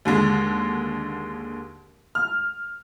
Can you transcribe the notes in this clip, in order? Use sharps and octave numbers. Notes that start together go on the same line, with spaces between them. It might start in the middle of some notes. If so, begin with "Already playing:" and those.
D#2 D3 G#3
F6